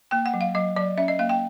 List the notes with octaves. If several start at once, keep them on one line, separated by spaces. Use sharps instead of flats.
A#3 G5
F#5
F#3
F5
F#3 D#5
F#3 D5
C#4 E5
D#5
A#3 F5
G5